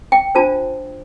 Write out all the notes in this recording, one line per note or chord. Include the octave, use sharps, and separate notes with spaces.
G5
D4 F4 C5 A5